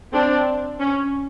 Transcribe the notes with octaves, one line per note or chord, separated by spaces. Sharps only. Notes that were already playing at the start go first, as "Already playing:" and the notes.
C4 D4
C#4